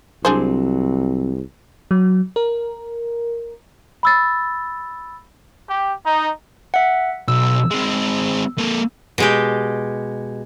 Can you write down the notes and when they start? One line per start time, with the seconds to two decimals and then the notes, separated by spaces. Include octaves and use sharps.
0.25 C2 F#3 C4 D4 G#4 C5
1.91 F#3
2.36 A#4
4.03 B5 E6 A6
5.67 G4
6.04 D#4
6.74 E5 F#5
7.28 B1 E6
7.71 G#3 C4
8.58 A#3 A4
9.18 B2 G#3 G4